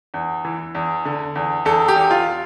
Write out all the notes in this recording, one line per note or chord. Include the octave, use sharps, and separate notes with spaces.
E2
E3
E2
D3
E2
E2 A4
G4
E2
F4